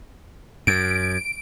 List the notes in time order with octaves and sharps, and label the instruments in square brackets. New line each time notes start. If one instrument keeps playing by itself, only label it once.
[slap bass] F#2 [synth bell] D7